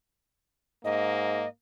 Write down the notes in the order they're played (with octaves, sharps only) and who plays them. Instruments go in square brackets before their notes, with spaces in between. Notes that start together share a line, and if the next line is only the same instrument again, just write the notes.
[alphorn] G#2 [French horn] A#3 [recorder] D#5